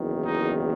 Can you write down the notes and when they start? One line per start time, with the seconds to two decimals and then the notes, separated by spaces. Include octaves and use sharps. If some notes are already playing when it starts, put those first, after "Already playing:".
Already playing: F#1 E2 D#3
0.24 D#4